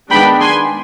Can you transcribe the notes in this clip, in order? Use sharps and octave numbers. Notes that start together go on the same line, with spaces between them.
D#3 G#3 B3 D4 G5 B5
G#5 C6